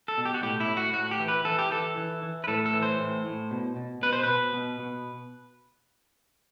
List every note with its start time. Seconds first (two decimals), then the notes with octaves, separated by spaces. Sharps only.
0.08 A4
0.18 B2
0.25 G4
0.34 F#4
0.43 A2 G4
0.60 E4
0.68 A2
0.77 F#4
0.94 A2 F#4
1.11 G4
1.20 E3
1.28 B4
1.45 E3 A4
1.59 G4
1.71 E3 A4
1.97 E3
2.23 E3
2.44 B4
2.48 A2 A4
2.66 A4
2.73 E3
2.83 C5
3.00 A2
3.26 A2
3.51 B2
3.76 B2
4.02 B2 B4
4.13 C5
4.23 B2 B4
4.54 B2
4.80 B2